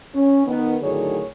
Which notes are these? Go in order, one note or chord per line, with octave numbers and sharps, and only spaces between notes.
C#4
D#3 B3
A2 D3 D#3 F#3 G#4 C#5